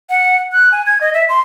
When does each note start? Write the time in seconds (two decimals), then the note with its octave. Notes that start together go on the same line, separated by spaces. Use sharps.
0.10 F#5
0.52 F#6
0.72 G#5
0.86 G#6
1.01 D#5
1.14 E5
1.29 C6